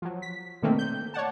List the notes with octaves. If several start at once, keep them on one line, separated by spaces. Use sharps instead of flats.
F3 F#3
B6
B2 D3 D#3 A3 A#3 C4
G6
C#5 D5 F#5 A5